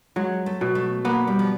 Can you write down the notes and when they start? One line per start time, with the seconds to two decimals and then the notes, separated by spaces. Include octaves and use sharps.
0.16 F#3 G#3
0.46 A3
0.61 B2
0.75 A3
1.05 A#3 B3
1.27 G3
1.39 F3